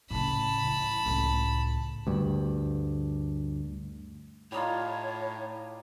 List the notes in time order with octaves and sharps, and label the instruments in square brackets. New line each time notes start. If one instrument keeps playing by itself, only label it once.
[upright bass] A2 C#3 [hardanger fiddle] A5 B5
[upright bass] E3
C#2 A2
[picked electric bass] D2 G2
[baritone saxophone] A2 [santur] G3 D#4 F4 [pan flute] C#5